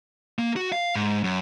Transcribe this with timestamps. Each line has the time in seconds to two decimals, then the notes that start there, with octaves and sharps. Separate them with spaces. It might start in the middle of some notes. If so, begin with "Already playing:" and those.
0.39 A#3
0.56 F#4
0.72 F5
0.96 G#2
1.24 F#2